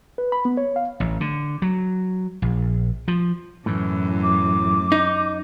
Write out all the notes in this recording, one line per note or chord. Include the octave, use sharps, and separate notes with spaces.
B4
B5
B3
C#5
F5
A1
D3
F#3
A#1
F3
F#2 A2 E3
D6
D#4